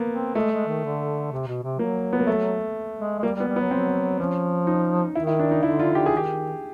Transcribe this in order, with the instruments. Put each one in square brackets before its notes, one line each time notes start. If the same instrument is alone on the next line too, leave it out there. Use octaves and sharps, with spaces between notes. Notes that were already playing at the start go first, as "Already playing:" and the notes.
Already playing: [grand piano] A#3 B3
[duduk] C4
[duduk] G#3 [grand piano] A3
[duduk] G#3
D#3
D3
C3
B2
C3
[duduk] F#3 [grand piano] A#3
[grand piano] B3
A#3
A3
[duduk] G#3
G#3
[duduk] G3 [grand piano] A#3
[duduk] G3
[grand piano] B3
[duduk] G3
[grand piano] B3
[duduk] F#3
[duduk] F#3 [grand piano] C4
[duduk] F3 [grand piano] C#4
[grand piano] D#4
[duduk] D#3 [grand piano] E4
[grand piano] E4
D4
D#4
[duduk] D3 [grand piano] E4
[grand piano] F4
G4
[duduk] D#3 [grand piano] G#4
[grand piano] G4